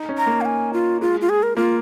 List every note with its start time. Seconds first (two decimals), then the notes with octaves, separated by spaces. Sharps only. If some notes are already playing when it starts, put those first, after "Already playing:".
Already playing: D#4
0.09 C#4
0.18 A#5
0.26 A#3
0.41 F5
0.45 G#5
0.73 F4
1.01 G#3 F4
1.21 F4
1.29 G#4
1.43 A#4
1.57 A#3 F4